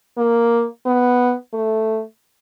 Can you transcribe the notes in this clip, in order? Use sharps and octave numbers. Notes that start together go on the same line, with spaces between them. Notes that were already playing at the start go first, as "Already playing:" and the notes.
A#3
B3
A3